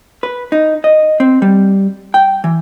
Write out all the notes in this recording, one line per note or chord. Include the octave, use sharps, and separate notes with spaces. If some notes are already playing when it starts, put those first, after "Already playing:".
B4
D#4
D#5
C4
G3
G5
E3